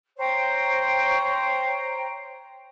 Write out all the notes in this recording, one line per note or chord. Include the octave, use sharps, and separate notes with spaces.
C5 C#5 G5 A#5